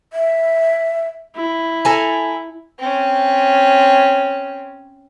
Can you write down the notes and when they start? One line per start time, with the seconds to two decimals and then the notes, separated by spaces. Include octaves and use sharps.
0.13 E5
1.36 E4
1.85 A4 G#5 A#5
2.79 C4 C#4